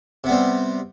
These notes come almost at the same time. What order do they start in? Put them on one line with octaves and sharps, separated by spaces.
C3 B3 G3 C4